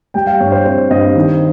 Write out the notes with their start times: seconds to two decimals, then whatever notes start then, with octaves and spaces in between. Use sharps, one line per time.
0.14 G3 G5
0.27 F5
0.40 G2 C#5
0.52 C5
0.65 C4 C5
0.90 G2 D#5
1.16 D#3